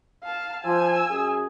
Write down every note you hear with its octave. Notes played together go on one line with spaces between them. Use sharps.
F5 A5
F3 G#5 E6
F#2 G#4